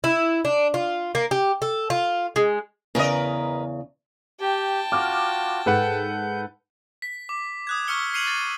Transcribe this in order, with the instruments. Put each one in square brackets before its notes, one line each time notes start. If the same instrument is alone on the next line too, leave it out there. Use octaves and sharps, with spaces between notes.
[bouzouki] E4
D4
F4
A#3
G4
A4
F4
G#3
[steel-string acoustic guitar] E2 C#3 [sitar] A#4 B4 D#5
[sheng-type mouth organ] G4 [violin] G5 A5
[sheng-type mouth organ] F4 F#4 [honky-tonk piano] D6 F6
[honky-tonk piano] G#2 [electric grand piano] A4 B4 F#5 [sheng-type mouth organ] G6
[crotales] B6
D6
D#6 F#6 G#6
C#6 E6 F6 C#7 G7
F6 C7 C#7 D#7 F7 F#7
A6